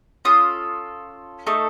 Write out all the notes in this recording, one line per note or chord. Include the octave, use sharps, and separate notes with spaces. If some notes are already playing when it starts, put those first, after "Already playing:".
C#4 F4 A4 D#6
A3 D#4 A4 C#6